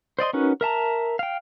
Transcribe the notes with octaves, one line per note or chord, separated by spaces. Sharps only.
C5 D5 D#5 C6
C#4 D#4 F#4 A#4 B4
A#4 E5 A5 A#5
F5 G5